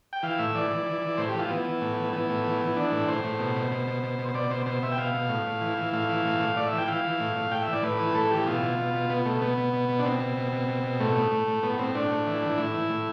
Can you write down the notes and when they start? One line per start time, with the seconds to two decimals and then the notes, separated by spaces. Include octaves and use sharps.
0.13 G5
0.23 E3 F5
0.39 A2 E5
0.55 E3 D5
0.71 E3
0.86 E3
1.02 E3
1.18 A2 C5
1.29 G4
1.34 E3 F4
1.50 E3 B3
1.65 E3
1.81 A2
1.97 E3
2.13 E3 B3
2.29 A2
2.44 E3
2.61 E3
2.76 E3 D4
2.92 A2
3.08 A2 C5
3.24 A2
3.39 B2
3.56 B2
3.72 B2
3.87 B2
4.03 B2
4.19 B2
4.29 C5
4.34 B2 D5
4.50 B2 C5
4.66 B2 C5
4.83 B2 E5
4.92 G5
4.98 B2 F5
5.14 B2
5.29 A2
5.46 A2
5.61 E3
5.78 E3
5.93 A2 F5
6.09 E3
6.25 A2
6.40 A2
6.56 A2 D5
6.67 E5
6.73 E3
6.78 G5
6.88 E3 F5
7.04 E3
7.20 A2
7.36 A2
7.51 A2 G5
7.63 E5
7.68 E3 D5
7.83 A2 B4
8.00 E3
8.14 A2 A4
8.31 E3 G4
8.47 B2 F4
8.62 B2
8.79 B2
8.94 B2
9.10 B2 B3
9.25 B2 A3
9.42 B2 B3
9.58 B2
9.73 B2
9.89 B2
9.99 D4
10.05 B2 C4
10.20 B2
10.37 B2
10.52 B2
10.68 B2
10.83 B2
11.00 A2 A3
11.16 A2
11.32 A2
11.48 A2
11.63 A2 B3
11.79 A2 C4
11.95 A2 D4
12.11 A2
12.27 E3
12.42 E3
12.58 A2 E4
12.74 E3
12.90 A2